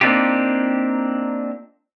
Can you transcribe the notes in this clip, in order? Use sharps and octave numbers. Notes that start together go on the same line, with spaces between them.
A#3 C4 D4 D#4 F4 G4